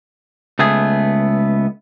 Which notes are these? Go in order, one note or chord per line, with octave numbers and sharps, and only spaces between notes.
C#2 A3 B3 G#4